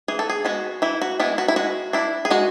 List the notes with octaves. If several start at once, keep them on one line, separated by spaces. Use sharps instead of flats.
E3 G#4
A4
G#4
G#3 B3 F#4
E3 E4
F#4
G#3 B3 E4
F#4
E4
G#3 F#4
D4 E4
G#4
G#3 F#4